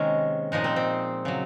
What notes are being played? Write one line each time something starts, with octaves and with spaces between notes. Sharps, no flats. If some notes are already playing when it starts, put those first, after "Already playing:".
Already playing: C3 D#3 G#3 A#3 C#4
A#2 F3 G#3 D#4
C4
C4
C#3 F#3